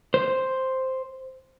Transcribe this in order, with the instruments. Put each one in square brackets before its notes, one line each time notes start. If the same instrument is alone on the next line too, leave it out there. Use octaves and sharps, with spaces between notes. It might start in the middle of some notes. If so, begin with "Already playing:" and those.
[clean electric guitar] C5